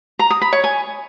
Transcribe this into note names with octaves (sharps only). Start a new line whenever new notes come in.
A#5
D#6
B5
C#5
G#5